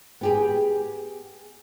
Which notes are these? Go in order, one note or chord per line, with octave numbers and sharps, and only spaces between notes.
B3 G4 G#4